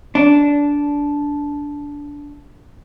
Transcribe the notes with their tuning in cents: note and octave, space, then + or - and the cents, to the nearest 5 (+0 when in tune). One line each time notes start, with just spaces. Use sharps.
D4 -15